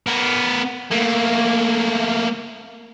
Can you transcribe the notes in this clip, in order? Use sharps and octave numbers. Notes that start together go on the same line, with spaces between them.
B3 A#4
A3 A#3